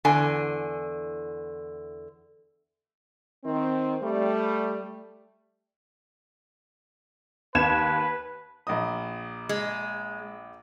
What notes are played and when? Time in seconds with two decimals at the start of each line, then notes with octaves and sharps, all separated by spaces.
0.05 E2 D3 G#5
3.45 D#3 C4
4.03 G3 A3
7.55 D#2 B4 G#6 E7
8.67 A#1 D#5 D#6
9.49 G#3